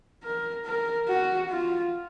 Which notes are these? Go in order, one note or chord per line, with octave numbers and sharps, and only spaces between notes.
A#4
A#4
F#4
F4